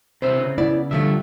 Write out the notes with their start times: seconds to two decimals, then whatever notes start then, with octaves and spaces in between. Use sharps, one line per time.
0.22 C3 B4 C5 E5
0.41 C#3
0.58 B3 E4 D5
0.91 G2 D3 F3 A3 E5